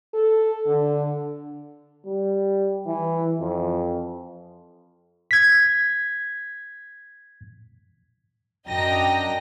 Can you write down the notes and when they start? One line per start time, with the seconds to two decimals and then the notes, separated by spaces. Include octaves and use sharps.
0.14 A4
0.67 D3
2.06 G3
2.87 E3
3.40 F2
5.31 G#6 B6
8.69 F#2 D4 D#5 G5 A#5 A#6